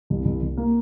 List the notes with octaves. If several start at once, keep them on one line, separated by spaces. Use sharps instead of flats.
C2
C2
C2
A#3